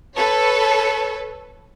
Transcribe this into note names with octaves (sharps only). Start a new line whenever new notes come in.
A4 B4 C#5